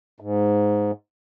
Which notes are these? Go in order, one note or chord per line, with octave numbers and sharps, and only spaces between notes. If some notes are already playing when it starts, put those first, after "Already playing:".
G#2